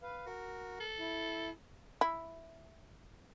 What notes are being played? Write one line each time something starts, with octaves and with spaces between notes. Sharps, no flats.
B4 F5
F#4 A#4
A4
E4
E4